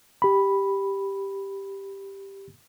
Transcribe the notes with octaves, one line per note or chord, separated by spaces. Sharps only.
G4 B5